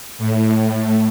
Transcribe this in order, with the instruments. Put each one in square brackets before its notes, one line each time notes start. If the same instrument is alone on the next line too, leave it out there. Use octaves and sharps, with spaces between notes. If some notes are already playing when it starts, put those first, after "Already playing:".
[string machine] A2